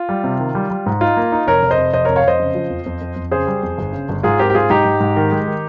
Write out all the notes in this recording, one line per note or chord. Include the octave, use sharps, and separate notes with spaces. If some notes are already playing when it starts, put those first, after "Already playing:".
Already playing: F4
G3
C3
D#3
G3
G3
G#2
D#4 F4
A#3
D#4
F1 A#4 C#5
F1
C5 D#5
F1
F1 C5 D#5
F1 A#4 C#5
C#5 F5
F1 C5 D#5
C#3
F3
F2
F2
F2
F2
C#3 G#4 C5
G3
F2
G1
C#3
G1
G#2 F4 G#4
C4 G4 A#4
G4
G#2 F4 G#4
G#2 D#4 G4
G#2
G#2
D#3
G#3
D#3